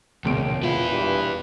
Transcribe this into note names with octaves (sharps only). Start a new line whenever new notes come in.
E1 C#2 A#2 D7
B3 E4 F4
G2